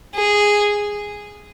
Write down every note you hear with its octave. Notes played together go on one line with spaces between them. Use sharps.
G#4